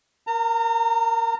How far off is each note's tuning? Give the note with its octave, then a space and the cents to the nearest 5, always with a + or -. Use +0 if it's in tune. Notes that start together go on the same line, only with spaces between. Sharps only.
A#4 +0 A#5 -40